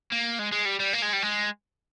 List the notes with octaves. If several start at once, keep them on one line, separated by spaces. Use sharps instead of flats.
A#3
G#3
G#3
G3
G3
A#3
G#3
G3
G#3